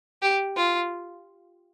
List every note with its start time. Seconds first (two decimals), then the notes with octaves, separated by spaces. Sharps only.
0.22 G4
0.56 F4